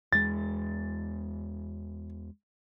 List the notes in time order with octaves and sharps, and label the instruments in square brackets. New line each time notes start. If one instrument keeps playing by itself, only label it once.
[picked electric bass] E2 G#3 [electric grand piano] A6